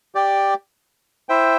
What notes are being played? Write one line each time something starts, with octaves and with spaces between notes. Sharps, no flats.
G4 D5 G5
E4 C5 E5 G5